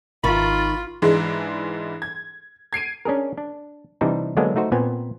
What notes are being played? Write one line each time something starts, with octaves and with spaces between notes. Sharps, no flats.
G#1 D#3 F4 B5 C#6 A6
G#2 E3 G#3 D4
G#6
G#6 C7 D7 D#7
C#4 D4 G#4 A#4
D4
C3 E3 G3 D4 D#4 C5
D3 F#3 G#3 A#3 B3 D4
A3 D#4 F#4 C5
A#2 B3 C4 G#5